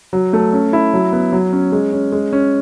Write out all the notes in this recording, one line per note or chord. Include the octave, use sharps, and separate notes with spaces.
F#3
A3
C#4
E4
F#3
B3
F#3
C#4
G#3
C#4
G#3
C#4